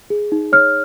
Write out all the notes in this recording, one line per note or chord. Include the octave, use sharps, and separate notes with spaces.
G#4
D#4
C#5 F6